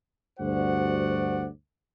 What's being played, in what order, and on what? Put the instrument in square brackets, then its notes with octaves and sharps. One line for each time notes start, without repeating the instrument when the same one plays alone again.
[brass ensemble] D2 G2 F#4 C5 D5 F#5